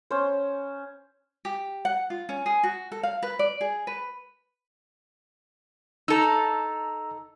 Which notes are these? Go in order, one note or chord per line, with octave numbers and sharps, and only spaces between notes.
C#4 C5
G4
F#5
F4
C#4
G#4
F#4
A4
F5
B4
D5
G#4
B4
D#4 A4 A#5 E6